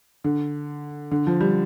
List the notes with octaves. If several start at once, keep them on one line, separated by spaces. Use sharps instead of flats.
D3
D3
F3
G3